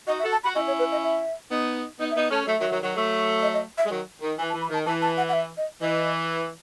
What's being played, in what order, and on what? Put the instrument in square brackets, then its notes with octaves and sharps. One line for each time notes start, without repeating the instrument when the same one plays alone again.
[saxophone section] D#4 F#4 [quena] D#5
[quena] E5
[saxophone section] F#4 A4
[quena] A5
[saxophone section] F#4 [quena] B5
[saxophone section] C#4 E4 [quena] D#5
[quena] C#5
B4
D#5
E5
[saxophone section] B3 D#4
[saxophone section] B3 D#4 [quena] D#5
[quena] E5
[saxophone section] B3 D#4
[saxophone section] A3 C#4 [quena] A5
[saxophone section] F#3 A3 [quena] E5
[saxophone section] D#3 F#3
D#3 F#3
D#3 F#3
F#3 A3
[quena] D#5
D#5
E5
[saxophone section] G#3
D#3 F#3
D#3
[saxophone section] E3 [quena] G#5
[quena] A5
[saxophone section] E3
[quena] B5
[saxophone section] D#3 [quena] A5
[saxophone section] E3 [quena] A5
[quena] A5
F#5
F#5
E5
D#5
[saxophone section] E3 [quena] D#5